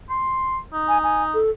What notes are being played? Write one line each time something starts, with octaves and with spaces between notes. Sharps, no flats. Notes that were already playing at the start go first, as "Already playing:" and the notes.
C6
D#4
G#5
G#5
A4